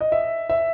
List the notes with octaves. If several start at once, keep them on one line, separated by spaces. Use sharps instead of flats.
D#5
E5
E5